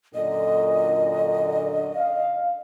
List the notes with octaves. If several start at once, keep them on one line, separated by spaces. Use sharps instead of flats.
F#2 A#2 D3 D#5
F5